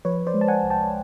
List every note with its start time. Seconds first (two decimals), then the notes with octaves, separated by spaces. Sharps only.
0.05 F3 B4 C#5
0.27 C5 D5
0.34 G#3
0.41 A5
0.48 F#5 G#5
0.63 C2
0.70 G5 A5